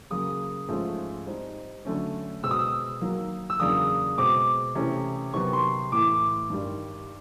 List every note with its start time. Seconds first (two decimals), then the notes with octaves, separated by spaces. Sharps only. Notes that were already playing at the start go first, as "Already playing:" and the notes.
0.10 C#3 F#3 A#3 D#6
0.68 G#2 F3 A3 C#4 F4
1.27 G3 C4 D#4
1.85 D3 F#3 A3 C#4
2.43 B2 G#3 C4 E6
2.51 D#6
2.59 E6
3.01 D#3 F#3 A#3
3.50 E6
3.59 E2 C#3 F#3 A#3 D4 D#6
4.17 B2 G#3 C4 D6
4.75 C3 E3 A3 C#4
5.33 C3 D#3 F#3 B3 C#6
5.53 C6
5.92 A2 E3 A3 D6
6.50 G2 D#3 G3